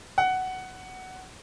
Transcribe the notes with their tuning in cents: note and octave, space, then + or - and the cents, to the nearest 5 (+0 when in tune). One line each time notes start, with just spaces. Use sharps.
F#5 +10